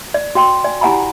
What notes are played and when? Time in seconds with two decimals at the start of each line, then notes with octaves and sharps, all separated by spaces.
0.14 D5
0.35 F#4 G5 C6
0.64 D5 G#5
0.81 E4 G4 F#5 G#5 A#5 B5